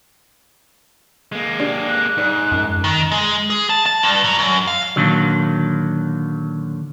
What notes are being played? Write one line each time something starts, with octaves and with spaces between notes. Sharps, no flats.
G#3 A#3
D4 G4
F#6
G#2 G3 D5
F#2 F3
D#3
G#3
G#4
A5
A5
G2
F#3
F#2
F5
A#2 D3 D#3 F#3